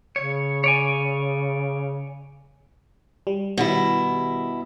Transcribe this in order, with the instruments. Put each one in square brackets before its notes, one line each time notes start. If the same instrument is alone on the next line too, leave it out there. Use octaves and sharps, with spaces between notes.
[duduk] C#3 [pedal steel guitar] C#5
[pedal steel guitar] C#5 D5 G#5
[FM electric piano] G3
[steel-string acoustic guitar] B2 E4 [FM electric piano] D#3 G3